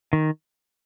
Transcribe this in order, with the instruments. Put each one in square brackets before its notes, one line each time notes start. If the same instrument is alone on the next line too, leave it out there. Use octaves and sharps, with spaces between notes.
[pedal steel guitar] D#3